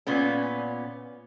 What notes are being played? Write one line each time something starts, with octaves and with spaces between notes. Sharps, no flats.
A#2 B3 C#4